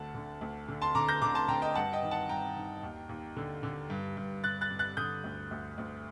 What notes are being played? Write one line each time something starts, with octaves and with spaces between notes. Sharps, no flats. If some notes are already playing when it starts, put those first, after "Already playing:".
Already playing: D2 D3 F#5 A5
D3
D2
D3
A5 C6
D3 A#5 D6
G6 A#6
D3 A#5 D6
A5 C6
D3 G5 A#5
D#5 G5
G2 F#5 A5
D#5 G5
D#3
F#5 A5
G2 G5 A#5
D#3
D#2
D#2
D3
D3
G2
G2
G2 F#6 A6
F#6 A6
G2
F#6 A6
D3 D#6 G6
D2
D2
D2